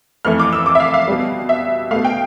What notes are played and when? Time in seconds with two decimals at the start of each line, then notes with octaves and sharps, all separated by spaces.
0.25 F2 E3 A3 F6
0.39 D6
0.53 E6
0.66 D6
0.75 E5
0.80 F5
0.94 F5
1.08 B2 G3
1.49 E5
1.91 B2 A3 F5
2.04 G5